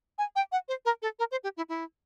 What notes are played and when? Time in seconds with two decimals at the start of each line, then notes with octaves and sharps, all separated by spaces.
0.18 G#5
0.36 G5
0.52 F#5
0.68 C5
0.85 A#4
1.02 A4
1.19 A#4
1.31 C5
1.44 G4
1.57 E4
1.69 E4